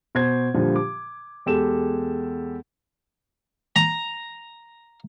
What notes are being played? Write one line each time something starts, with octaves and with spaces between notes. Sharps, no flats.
B2 C5 G#6
A#2 D3 F3 G3
D6
E2 G#3 G4 A4 E7
A#5